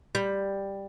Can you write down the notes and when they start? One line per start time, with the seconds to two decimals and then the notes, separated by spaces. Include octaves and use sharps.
0.15 G3